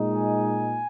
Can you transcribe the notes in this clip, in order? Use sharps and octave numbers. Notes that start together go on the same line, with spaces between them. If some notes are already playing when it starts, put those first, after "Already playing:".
Already playing: A#2 G#3 D#4
G#5